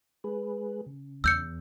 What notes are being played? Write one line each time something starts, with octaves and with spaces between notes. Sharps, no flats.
G#3 G#4 B4
C#3
E2 E6 G6 C#7